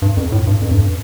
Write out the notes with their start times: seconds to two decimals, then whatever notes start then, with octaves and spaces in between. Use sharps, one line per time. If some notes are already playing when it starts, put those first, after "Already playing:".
0.02 G2
0.17 F2
0.32 A2
0.47 G2
0.61 F2
0.71 G2